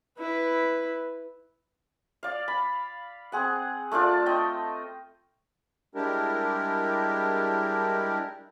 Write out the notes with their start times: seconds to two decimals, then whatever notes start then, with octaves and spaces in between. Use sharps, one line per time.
0.19 E4 B4
2.23 D5 F5
2.48 B5
3.32 C4 G#4 F#5
3.92 A3 D4 F4 D5
4.26 D#5 G5
5.95 G3 G#3 D4 E4 G4 A#4